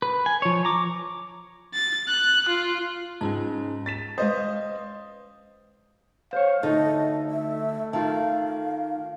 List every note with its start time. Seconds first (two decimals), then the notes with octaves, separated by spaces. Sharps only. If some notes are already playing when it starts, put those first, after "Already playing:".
0.02 B4
0.26 G#5
0.42 F3 C#5
0.65 A#5 D6
1.74 A6
2.08 F#6
2.49 F4
3.21 G#2 C#4 F4 A5
3.86 A6 B6 E7
4.18 G#3 B4 C5 D#5 F5 D#6
6.33 C5 C#5 F5
6.63 D2 A3 D#4 A4 D#5
7.30 E5
7.93 D#3 F4 F5 A5